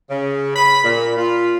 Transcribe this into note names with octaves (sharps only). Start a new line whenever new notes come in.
C#3
B5
A#2
F4